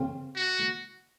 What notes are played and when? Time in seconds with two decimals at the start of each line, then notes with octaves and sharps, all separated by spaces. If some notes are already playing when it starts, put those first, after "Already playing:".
Already playing: C#3 C4
0.36 F#4